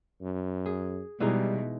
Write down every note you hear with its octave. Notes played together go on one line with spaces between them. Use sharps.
F#2
G#4
B2 E3 G3 G#3 D#4